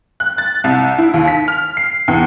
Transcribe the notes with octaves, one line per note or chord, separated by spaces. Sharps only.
F#6
A6
C2
E4
D#2
B6
F6
C7
E2